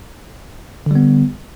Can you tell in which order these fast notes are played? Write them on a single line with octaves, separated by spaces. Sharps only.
D3 G3 B3